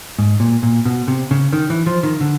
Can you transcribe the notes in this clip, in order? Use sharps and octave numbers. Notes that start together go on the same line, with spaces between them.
G#2
A#2
A#2
B2
C3
C#3
D#3
E3
F3
D#3
D3